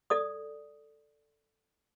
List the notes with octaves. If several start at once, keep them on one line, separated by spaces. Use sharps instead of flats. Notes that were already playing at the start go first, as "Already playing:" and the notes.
A4 D5 D#6